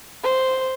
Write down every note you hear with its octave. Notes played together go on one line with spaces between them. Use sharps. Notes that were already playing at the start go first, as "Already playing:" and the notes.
C5